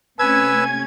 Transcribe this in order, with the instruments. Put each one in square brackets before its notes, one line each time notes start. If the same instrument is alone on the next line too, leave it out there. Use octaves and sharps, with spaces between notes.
[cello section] C3 A3 C#4 [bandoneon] B4 E6 [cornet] G#5 [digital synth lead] G#6